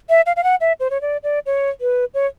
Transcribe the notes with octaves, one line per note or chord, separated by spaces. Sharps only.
E5
F5
F5
F#5
E5
C5
C#5
D5
D5
C#5
B4
C#5